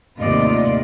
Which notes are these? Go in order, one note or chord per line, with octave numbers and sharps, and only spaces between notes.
D#2 A2 C3 F4 D5 D#5